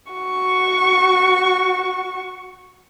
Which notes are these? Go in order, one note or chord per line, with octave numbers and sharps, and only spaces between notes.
F#4 C#6